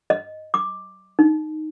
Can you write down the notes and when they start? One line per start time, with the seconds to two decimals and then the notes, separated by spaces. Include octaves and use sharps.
0.10 D#5
0.54 D6
1.19 D#4